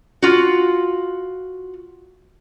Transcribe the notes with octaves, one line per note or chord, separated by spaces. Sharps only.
F4 F#4